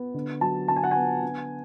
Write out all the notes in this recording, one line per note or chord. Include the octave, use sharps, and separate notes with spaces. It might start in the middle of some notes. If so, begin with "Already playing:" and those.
Already playing: B3
D3
F#3 A5
D3 A5
G#5
F#5
B3 G#5
D3